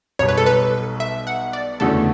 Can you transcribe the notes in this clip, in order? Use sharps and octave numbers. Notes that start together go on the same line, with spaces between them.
B1 B2 G3 C#5
B4
A4
B4
E5
F#5
D5
E2 D3 A3 C#4 F#4 A4